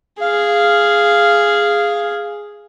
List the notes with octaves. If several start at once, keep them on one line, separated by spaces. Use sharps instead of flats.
G#4 F5